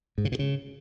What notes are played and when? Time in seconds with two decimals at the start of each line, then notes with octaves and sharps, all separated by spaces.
0.18 G#2
0.25 C#3
0.32 B2
0.39 C#3